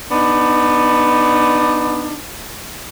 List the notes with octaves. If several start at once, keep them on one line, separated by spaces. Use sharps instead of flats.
B3 D4 D#4